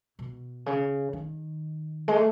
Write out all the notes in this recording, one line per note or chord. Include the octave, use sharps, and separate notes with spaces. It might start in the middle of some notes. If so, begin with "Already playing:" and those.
B2
C#3
D#3
G#3
A3